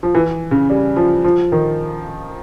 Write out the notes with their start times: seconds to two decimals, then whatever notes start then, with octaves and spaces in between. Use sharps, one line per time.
0.03 F3
0.15 E3
0.51 C#3
0.70 G3
0.96 F3
1.24 F3
1.52 D#3